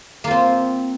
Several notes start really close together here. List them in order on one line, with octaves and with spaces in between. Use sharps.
A#3 F4 C4